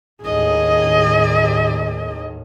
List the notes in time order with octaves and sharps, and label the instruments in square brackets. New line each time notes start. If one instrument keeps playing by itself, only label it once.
[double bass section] D#2 A2 D#3 [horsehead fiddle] G#4 D#5